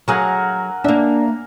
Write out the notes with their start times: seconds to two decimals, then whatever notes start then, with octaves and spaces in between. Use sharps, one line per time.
0.08 F#3 G#4 A#4 F#5 G#5
0.84 A#3 D4 E5